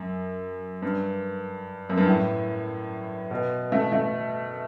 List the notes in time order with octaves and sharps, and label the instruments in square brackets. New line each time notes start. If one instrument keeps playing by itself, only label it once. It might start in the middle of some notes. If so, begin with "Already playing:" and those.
Already playing: [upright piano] F#2
G2
F#2
G2
A2
B2
A3
A3